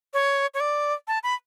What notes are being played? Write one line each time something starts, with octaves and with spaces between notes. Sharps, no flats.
C#5
C#5
D5
A5
B5